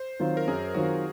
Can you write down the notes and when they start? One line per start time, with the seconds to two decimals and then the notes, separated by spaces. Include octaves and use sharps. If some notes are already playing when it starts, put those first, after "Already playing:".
Already playing: C5
0.20 D#3 F#3 C4 F4
0.37 A#4
0.47 F#2 G#4
0.74 D#3 F#3 C4 F4 F#4